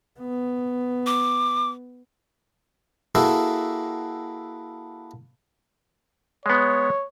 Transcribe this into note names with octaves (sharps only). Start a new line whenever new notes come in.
B3
D6
A#3 E4 F#4 G#4 A4
G#3 B3 C#5